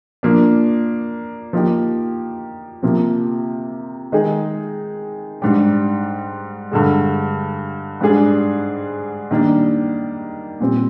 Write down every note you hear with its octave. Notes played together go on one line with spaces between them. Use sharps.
F3 A#3 D4
F3 A#3 D#4 G4
C3 F3 A#3
D#3 G#3 D#4 G#4
G#2 G3 D4 G4
G2 D3 G#3
G#2 G3 D4 G#4
D#3 G3 A#3 D4
A#2 G3 C4